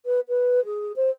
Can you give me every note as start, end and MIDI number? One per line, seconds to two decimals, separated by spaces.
0.05 0.20 71
0.28 0.63 71
0.65 0.92 68
0.96 1.10 72